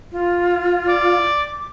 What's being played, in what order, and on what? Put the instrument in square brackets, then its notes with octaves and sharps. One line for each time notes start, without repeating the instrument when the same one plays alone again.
[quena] F4
[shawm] D5
[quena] D6